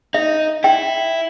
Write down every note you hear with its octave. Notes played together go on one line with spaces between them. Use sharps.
D#4 E5
E4 G5